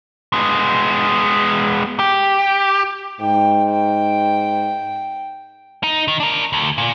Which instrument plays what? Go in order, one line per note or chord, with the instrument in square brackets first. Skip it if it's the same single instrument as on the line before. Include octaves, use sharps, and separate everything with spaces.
[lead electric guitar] G#3 B3
G4
[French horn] G#2 [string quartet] G5
[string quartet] G5
[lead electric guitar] D#4
D#3
D4 A#4
D2
A#2